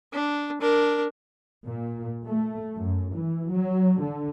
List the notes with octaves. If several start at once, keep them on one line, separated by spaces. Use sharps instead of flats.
D4
D4 A#4
A#2
A3
F#2
E3
F#3
D3